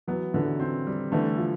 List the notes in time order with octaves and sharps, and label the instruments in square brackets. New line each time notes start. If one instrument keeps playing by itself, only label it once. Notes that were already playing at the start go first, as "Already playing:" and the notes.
[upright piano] E3 F#3 [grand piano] B3
[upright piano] D3 E3 [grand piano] F#3
[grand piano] C4
G3
[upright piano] D3 E3 [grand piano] A3
[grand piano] F3